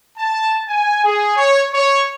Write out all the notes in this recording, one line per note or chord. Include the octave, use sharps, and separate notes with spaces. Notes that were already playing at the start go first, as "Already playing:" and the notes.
A5
G#5
G#4
C#5
C#5